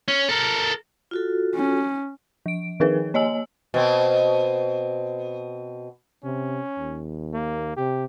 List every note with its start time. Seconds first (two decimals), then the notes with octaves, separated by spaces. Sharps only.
0.08 C#4
0.29 A4 A#4
1.11 F4 F#4 A4
1.55 C#4
2.46 F3 D7
2.80 D#3 F3 D#4 G#4 A#4 B4
3.14 A#3 C#5 D#5 G#5 E6 F#7
3.74 B2 C4
6.24 C3 C#4
6.78 D#2
7.33 A#3
7.77 C3 G4